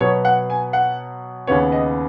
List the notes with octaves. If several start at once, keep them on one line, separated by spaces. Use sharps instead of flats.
B2 F#3 B3 C#5
F#5
G#5
F#5
D#2 C#3 B3 C#5
D#5